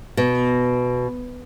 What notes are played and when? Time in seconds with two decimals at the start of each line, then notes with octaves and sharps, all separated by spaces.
0.17 B2